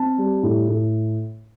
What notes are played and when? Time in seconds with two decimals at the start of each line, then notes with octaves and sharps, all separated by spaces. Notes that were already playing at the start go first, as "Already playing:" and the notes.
Already playing: C4 A5
0.18 G3
0.43 A2
0.69 A2